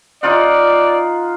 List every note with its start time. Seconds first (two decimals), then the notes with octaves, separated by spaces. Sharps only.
0.23 D#4 F4 D5 F#5